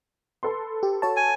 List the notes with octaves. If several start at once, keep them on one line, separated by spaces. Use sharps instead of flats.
A4 B4 C6
G4
F#4 C#5 A5
G#5